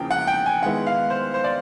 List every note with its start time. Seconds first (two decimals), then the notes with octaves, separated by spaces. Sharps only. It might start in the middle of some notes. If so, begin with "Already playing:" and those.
Already playing: E2 C#3 F3 A#3 G5
0.11 F#5
0.27 G5
0.46 G#5
0.63 D#3 G#3 B3 E4 F#5
0.87 F5
1.10 C5
1.34 C5
1.44 D5